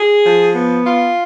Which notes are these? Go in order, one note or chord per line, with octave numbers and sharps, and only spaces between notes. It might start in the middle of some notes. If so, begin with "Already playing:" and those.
Already playing: G#4
F3
B3
F4